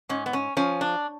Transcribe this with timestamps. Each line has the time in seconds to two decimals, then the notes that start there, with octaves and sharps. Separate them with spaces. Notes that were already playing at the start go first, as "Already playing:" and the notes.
0.09 G#2 C#4
0.26 B3
0.33 C#4
0.57 F3 C#4
0.81 D4